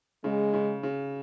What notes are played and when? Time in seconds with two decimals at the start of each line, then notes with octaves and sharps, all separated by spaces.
0.24 C#3 G#3
0.53 C#3
0.83 C#3